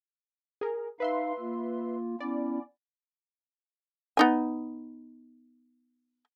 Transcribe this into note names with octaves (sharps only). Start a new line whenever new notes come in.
G#4 A#4
D#4 B4 E5 F5 C6
A#3 F4
B3 C#4 E4 D5
B3 D#4 G#5